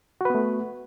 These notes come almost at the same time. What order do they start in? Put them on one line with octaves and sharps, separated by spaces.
F#4 B4 B3 A3